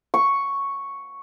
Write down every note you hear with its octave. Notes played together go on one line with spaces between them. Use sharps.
C#6